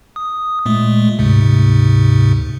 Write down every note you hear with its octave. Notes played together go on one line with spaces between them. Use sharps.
D#6
A#2 G#3 A3
D2 G#2 C3